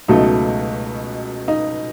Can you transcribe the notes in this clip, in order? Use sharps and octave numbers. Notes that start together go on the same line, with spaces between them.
C#2 B2 F#3 A3 D#4
D#4